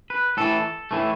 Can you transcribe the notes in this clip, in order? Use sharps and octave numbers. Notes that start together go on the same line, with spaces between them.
B4
A2 E3 A3 A4
A2 E3 A3